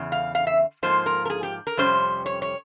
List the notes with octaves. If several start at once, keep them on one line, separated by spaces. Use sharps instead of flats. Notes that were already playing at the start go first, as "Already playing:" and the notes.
Already playing: E2 C#3
F5
F5
E5
G#2 F3 A#3 C5
A#4
A#4
G#4
G4
A#4
F2 C3 G3 C#4 C5
C#5
C#5